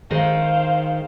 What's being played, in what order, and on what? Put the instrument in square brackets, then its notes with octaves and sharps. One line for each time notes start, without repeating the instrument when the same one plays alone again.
[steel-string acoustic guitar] D#3 G#3 [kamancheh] C5 F5